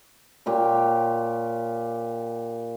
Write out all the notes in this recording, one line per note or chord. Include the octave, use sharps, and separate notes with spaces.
A#2 G4 C#5